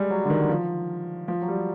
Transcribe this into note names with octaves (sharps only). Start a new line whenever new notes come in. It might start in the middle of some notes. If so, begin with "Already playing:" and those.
Already playing: G3 G#3
F#3
D3
D#3
F3
F3
F#3
G3